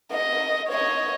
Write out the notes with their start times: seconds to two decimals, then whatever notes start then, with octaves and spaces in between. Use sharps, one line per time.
0.12 D#5
0.69 C#5 D#5